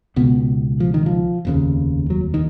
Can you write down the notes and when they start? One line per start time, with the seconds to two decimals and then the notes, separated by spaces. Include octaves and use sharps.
0.16 C#2 B2 B3
0.80 F3
0.94 D#3
1.06 F3
1.45 F1 D#2 C#3
2.10 F#3
2.34 D#3